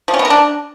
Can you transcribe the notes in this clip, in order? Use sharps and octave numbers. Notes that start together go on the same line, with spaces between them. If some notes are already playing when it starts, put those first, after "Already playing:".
F3
C#4
B3
A#4
D4